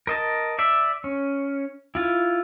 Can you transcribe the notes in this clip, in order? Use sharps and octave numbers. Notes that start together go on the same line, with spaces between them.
A#4 D#5 A5
D5 E5
C#4
E4 F4